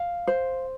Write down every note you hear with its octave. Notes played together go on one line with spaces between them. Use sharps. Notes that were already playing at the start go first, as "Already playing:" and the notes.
Already playing: F5
C5